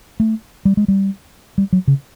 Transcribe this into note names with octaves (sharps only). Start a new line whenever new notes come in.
A3
G3
G#3
G3
G3
F#3
C#3